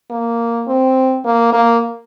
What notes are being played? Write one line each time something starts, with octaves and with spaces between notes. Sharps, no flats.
A#3
C4
A#3
A#3